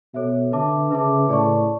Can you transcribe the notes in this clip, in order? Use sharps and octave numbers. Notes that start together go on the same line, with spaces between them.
B2 A4 C#5 E5
D3 B4 E5 A5 D6
C#3 B4 E5 A5 D6
A2 G#4 D5 A5 C#6